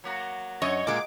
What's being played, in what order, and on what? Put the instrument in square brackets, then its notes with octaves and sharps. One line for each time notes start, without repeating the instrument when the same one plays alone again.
[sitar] F#3 A#3 F#4
[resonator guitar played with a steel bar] F#2 [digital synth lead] C#5 [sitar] D#5
[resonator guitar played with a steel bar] A#2 G#3 [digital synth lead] D6